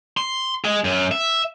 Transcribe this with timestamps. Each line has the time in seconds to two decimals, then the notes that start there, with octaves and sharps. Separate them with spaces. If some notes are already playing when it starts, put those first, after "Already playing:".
0.17 C6
0.65 G#3 G#4
0.84 F#2
1.11 E5